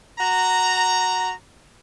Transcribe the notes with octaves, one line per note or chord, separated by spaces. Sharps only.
F#4 A#5